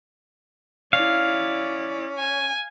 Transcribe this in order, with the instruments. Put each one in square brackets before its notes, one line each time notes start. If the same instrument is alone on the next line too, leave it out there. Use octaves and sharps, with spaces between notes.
[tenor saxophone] C#4 [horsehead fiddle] E4 D5 [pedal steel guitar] F5
[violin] G#5